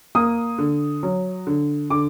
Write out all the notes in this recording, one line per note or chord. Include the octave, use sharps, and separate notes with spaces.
A#3 D#6
D3
F#3
D3
D3 D6